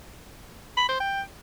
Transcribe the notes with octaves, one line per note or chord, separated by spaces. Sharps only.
B5
C5
G5